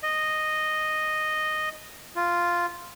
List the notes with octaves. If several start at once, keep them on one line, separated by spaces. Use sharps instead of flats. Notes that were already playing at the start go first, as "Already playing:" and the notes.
D#5
F4